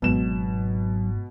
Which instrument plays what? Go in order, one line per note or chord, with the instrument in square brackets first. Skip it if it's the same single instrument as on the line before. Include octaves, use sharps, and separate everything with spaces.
[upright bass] G#1 G#2 [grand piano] B2 E7 [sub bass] F#3